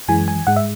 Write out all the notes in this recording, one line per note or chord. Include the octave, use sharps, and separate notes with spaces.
F#2 E3 G#3 G#5
G#5
G#2 G#3 F#5
E5